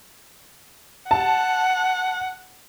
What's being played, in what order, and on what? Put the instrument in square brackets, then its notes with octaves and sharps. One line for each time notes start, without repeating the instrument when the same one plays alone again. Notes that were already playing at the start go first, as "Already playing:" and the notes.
[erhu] F#5 [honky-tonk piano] A5